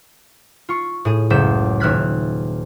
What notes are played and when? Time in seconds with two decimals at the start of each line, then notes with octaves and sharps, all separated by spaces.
0.69 F4 C#6
1.05 A2 G#4
1.30 F#1 C#2 G6 B6 E7
1.80 D#1 E5 F6 F#6 G#6 B6